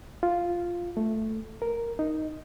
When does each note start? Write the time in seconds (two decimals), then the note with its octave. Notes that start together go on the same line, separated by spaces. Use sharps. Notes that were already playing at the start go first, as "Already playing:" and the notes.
0.23 F4
0.97 A3
1.62 A#4
1.99 D#4